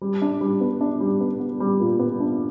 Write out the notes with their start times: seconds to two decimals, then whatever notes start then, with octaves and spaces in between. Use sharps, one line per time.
0.02 G3
0.22 D4
0.41 G3
0.61 B3
0.81 D4
1.00 G3
1.20 B3
1.40 B3
1.60 G3
1.80 A#2
1.99 B3
2.20 D4